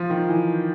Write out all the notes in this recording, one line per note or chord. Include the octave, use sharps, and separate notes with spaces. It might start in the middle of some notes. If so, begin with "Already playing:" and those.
Already playing: F3
D#3
E3